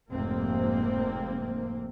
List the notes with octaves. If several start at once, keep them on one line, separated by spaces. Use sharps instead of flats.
F1 G#2 C3 A#3 C4